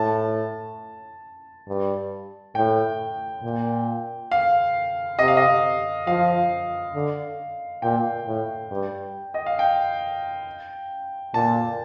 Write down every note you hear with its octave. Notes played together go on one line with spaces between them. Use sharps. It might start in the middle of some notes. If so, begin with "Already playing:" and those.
Already playing: A2 A5
G2
A2 G5
A#2
F5
C3 D#5
F5
D#5
F3 F5
D3
A#2 G5
A2
G2
D#5
F5
G5
A#2 A5